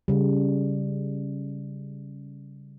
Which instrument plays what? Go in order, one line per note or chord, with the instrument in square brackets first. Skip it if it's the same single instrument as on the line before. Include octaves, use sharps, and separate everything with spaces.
[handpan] C#3 G3